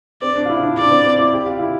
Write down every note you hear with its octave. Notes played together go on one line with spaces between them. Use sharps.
C4 D5
D4
F4
E4
D4
D4 D5
C4
C4
E4
G4
F4
E4